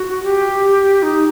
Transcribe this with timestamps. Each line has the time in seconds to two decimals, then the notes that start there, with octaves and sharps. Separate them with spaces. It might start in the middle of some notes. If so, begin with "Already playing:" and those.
Already playing: F#4
0.23 G4
1.03 D#4